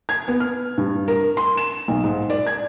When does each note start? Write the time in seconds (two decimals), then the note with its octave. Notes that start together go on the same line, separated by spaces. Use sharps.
0.09 G#6
0.28 B3
0.40 F6
0.77 G2
1.08 A#4
1.37 C6
1.57 E7
1.88 B1
2.04 G#2
2.30 D5
2.47 G#6